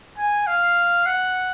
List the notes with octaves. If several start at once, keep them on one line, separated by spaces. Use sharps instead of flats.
G#5
F5
F#5